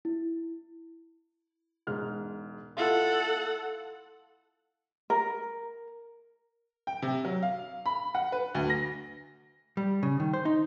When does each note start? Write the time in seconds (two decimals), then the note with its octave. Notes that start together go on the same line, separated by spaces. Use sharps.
0.05 E4
1.87 E1 G#2 F6
2.77 E4 F4 A4 F#5
5.10 A#4
6.87 G5
7.02 C3
7.25 F#3
7.43 F5
7.86 B5
8.15 F#5
8.32 B4
8.55 D2
8.70 A#6
9.77 G3
10.03 C#3
10.20 D#3
10.33 C5
10.45 D#4